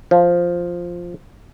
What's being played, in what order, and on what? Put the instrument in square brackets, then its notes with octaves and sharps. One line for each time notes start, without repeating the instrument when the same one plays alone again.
[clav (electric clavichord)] F3